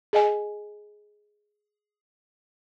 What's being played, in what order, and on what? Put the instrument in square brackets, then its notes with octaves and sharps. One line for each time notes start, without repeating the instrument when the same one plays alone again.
[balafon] G#4 D#5 G#5